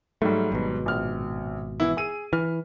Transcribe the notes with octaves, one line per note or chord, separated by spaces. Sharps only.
G#2 F#3 G3 A3
G#1 B2
A#1 F6
E3 B3 E4
G#4 E6 D#7
E3 F6